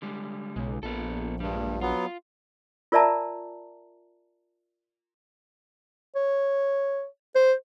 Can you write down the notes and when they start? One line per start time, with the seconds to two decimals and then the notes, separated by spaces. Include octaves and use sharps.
0.02 D3 G3 G#3
0.56 B1 C#3 G#3
0.83 A#1 B3 A4
1.40 G2 G3 G#3
1.81 F#3 B3 F4
2.92 F4 A#4 D5 E5 A5 A#5
6.15 C#5
7.35 C5